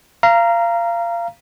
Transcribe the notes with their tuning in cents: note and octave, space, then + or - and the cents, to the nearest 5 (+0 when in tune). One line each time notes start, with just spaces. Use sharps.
F5 -25 A#5 +0